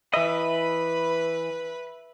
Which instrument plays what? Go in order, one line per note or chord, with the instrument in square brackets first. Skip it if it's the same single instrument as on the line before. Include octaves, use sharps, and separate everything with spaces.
[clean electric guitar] E3 D#5 [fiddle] B4 [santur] E5 [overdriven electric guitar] B5